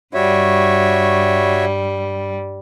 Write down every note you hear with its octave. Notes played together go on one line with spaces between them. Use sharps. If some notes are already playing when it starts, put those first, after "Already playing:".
G2 G3 F#4 C#5 E5